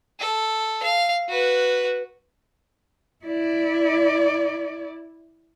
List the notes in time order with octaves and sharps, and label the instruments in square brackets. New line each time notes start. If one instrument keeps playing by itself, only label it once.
[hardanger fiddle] A4
F5
F#4 B4
[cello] E4 D5